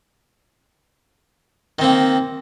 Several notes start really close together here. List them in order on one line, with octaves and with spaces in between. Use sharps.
D#3 C4 A#3